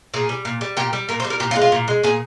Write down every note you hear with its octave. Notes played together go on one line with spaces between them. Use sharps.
A#2 G#4
G3
A#2
G3
A#2 G4
G3
A#2 A#4
C5
G3
A#4
A#2 G4
F4
G#3
F4
A#2
G#3
A#2 G#4